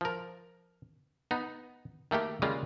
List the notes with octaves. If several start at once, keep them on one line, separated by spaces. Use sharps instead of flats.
F3 A#4
B3 D#4
D#3 A3 A#3 G4
C#3 G3 G#3 A#3 F4